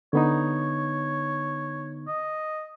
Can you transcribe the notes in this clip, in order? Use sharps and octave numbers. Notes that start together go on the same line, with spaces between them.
D3 B3 D#4 C#5
D#5